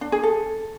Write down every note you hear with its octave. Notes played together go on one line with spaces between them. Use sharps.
D4
G#4
A4